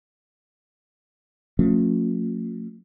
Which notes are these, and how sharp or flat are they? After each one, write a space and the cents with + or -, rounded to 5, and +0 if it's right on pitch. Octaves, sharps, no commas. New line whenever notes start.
F3 +40 A3 +45 C#4 +0